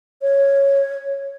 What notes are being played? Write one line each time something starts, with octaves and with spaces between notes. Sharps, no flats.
C#5